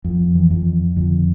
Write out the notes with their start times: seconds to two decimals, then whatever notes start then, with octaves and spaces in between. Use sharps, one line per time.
0.04 F2
0.35 E3
0.51 F2
0.96 F2 D3